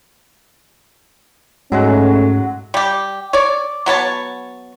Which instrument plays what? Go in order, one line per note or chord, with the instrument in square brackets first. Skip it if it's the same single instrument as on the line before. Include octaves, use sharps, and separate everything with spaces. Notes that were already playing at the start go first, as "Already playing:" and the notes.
[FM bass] G#2 [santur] F#3 G#3 F#4 [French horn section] A3 C#4
[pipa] G3 G4
C#5 D5
F#3 B3 C#5 A5